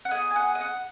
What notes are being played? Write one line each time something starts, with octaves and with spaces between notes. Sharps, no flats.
F#5
B3 G#4 D#5
G#5
F#5
D#5
F#5